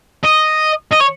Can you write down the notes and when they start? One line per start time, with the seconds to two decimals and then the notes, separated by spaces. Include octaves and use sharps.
0.23 D#5
0.91 D#5
1.00 C#5